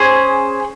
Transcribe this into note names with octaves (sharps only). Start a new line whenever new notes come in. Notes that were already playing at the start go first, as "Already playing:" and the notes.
Already playing: C#4 G#4 C5